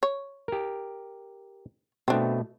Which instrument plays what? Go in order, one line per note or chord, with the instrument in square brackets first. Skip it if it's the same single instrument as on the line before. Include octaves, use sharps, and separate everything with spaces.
[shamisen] C#5
[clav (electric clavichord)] G4 A#4
[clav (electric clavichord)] B2 A3 [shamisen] C4 D4